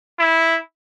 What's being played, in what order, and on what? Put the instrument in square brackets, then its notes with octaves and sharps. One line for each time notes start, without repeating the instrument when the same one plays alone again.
[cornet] E4